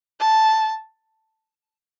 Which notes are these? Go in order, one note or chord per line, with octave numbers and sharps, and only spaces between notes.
A5